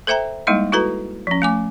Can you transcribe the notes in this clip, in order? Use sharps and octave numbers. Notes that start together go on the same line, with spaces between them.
A4 C5 E5 G5 A#5
G3 G#3 A#3 D#4 E4 D#5
E4 F#4 A4 B4 A#5
F3 C#4
A3 G#5 D6